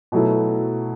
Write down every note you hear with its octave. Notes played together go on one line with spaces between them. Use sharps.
B2 F#3 A3 E4